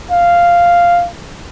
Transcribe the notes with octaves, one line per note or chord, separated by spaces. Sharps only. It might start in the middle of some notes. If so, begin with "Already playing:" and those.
F5